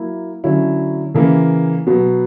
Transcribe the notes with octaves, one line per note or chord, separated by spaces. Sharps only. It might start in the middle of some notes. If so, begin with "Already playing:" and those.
Already playing: F#3 A#3 E4
D3 F#3 C#4 E4
C#3 E3 A#3
B2 F#3 B3